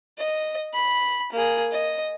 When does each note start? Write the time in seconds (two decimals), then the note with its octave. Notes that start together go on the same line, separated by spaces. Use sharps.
0.18 D#5
0.74 B5
1.32 A#3 G#4
1.72 D#5